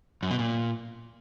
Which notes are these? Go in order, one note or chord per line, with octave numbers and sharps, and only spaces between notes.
F#2
B2
A#2